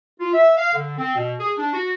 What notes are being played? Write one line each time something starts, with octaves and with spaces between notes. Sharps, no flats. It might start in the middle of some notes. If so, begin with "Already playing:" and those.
F4
E5
F5
D3
C4
B2
G#4
D4
F#4